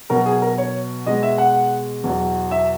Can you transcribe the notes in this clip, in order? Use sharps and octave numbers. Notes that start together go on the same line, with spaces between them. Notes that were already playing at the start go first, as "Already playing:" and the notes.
B2 F#3 A#4
G#4
A#4
C#5
B2 G#3 D#5
E5
F#5
E2 B2 F#3
E5